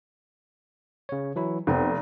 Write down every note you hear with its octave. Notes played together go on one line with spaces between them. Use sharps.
C#3 C#5
E3 F#3 E4
F1 B3 C4